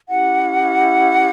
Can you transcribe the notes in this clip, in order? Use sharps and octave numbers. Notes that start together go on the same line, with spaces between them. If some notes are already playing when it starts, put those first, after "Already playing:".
C#4 E4 G4 F#5